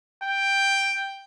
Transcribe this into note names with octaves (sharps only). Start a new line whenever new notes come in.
G5